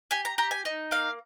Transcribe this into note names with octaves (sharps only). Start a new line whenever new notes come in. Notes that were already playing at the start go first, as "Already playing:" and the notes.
G4 G#5
A#5
G4 A#5
G#5
D#4
A#3 F5